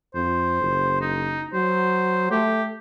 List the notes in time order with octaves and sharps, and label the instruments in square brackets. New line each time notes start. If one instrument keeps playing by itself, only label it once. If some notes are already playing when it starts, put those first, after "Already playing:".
[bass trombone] F2 [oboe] C5
[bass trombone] F#1
[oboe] D#4
[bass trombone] F#3 [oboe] C5
[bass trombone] A3 [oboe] G4